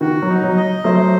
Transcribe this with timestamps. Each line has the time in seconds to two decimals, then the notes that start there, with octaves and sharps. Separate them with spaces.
0.01 D#3 F#4
0.22 F#3
0.29 D#4
0.44 F#3
0.57 D#5
0.84 F#3 A3 C5